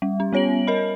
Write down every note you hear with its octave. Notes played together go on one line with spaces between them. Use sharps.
G3
C#4
G3 B3 C#5 D7 F#7
A#4 D#5 B5